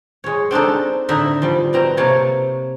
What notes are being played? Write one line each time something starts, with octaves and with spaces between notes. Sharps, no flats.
G#3 C#5
C4 D4 D#4 A4
A2 D3 D#4 E5
F3 G3
B2 C4 A#5
C3 A#3 C#5 A5